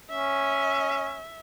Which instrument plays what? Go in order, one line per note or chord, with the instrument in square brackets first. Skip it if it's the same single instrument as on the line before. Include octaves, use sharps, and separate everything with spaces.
[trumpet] C#4 [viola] E5